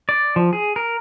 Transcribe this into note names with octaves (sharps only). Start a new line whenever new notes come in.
D5
F3
G#4
A#4